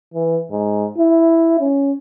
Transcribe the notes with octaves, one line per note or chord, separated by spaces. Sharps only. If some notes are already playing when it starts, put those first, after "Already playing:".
E3
G#2
E4
C#4